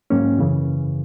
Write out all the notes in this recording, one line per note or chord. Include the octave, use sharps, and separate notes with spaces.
G#2 F#3 A#3 C#4
F#2 C#3 E3